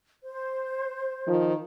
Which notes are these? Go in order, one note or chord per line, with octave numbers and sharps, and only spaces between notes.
C5
D#3 F3